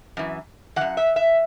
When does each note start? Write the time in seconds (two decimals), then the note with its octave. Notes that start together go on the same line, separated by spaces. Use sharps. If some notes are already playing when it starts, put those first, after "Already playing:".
0.17 F#2 E3
0.76 F#2 E3 F#5
0.97 E5
1.16 E5